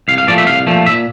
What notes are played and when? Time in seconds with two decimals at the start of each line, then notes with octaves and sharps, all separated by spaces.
0.08 C2 F5
0.18 F5
0.28 A#2 F3 A3 D5
0.38 E5
0.47 C2 F5
0.67 A#2 F3 A3
0.86 A#2 E5